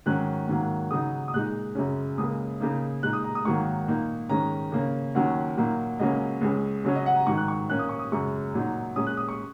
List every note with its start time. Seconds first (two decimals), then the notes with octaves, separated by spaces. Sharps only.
0.06 G#2 D#3 F#3 C#4 F#6
0.48 G#2 D#3 F#3 A#3
0.91 C#3 F#3 D#4 D#6
1.28 D#6
1.33 A#2 G#3 D#4 F#6
1.75 F#2 C#3 G#3 C#4
2.18 C#2 C#3 A#3 D#6
2.60 C#3 A#3 D#4
3.03 A#2 G#3 D#4 F#6
3.13 D#6
3.24 A#5
3.35 D#6
3.45 G#2 D#3 F#3 A#3 C#6
3.88 A#2 A#3 D#4
4.29 G#2 D#3 G#3 C#4 A#5
4.72 C#3 A#3 C#4
5.15 D#2 D#3 F#3 C#4 F#5
5.57 A#2 F#3 A#3 D#4
5.99 C#2 C#3 F#3 A#3 C#4 D#5
6.41 C#2 C#3 G#3 C#4
6.84 C#3 F#3 C#4 C#5
6.95 D#5
7.06 F#5
7.16 A#5
7.27 G#2 D#3 F#3 D#4 C#6
7.37 F#6
7.48 C#6
7.69 A#2 A#3 C#4 F#6
7.79 D#6
7.89 C#6
7.99 D#6
8.12 F#2 C#3 G#3 C#6
8.54 A#2 F#3 D#4
8.96 A#2 G#3 C#4 D#6
9.07 F#6
9.17 D#6
9.29 C#6